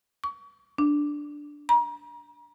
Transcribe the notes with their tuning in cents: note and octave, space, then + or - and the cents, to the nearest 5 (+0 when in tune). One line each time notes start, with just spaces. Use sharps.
C#6 +30
D4 +0
A#5 +35